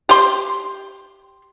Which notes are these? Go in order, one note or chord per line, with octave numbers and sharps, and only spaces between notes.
G4 C6